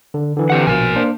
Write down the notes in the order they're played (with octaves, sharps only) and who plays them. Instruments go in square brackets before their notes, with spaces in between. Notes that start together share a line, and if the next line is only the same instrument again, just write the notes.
[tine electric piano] D3
D3 E3
[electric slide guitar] C4 G4 F#5
[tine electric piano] A#1 B2 [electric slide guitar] A#4 G#5
[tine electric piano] A#3 D4 C5